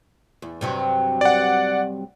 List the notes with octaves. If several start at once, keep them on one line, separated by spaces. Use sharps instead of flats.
E2
G2 C3 F#3
D5 F#5